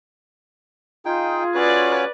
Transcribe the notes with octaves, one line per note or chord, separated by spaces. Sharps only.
D#4 F4 G#4 G5
C#4 F#4 B4 C#5 D5